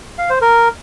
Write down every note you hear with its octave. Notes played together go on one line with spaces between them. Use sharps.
F5
C5
A#4